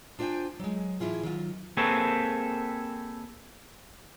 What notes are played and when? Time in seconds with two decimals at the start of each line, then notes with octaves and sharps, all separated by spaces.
0.19 D4 F4 C5 E5 G5 G#5
0.60 F#3 G#3
1.00 A2 E3 E4 F4 G#4
1.23 D#3 F#3 F4
1.77 A#3 C4 G#4 A4 B4 C#5